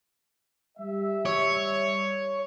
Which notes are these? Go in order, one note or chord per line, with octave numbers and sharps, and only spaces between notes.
G3 E5
C#5